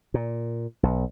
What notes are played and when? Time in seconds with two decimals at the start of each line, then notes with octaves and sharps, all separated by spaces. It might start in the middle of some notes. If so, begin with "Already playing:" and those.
0.14 A#2
0.83 B1